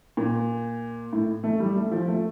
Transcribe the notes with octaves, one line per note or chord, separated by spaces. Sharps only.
A#2
A2
A3
G3
A3
F3
A3